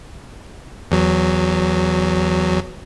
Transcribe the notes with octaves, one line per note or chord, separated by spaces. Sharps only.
E2 F#3